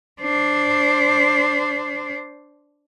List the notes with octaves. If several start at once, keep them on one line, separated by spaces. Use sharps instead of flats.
D4 C5